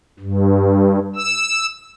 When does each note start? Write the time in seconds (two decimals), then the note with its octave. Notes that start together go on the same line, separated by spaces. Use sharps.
0.20 G2
1.16 E6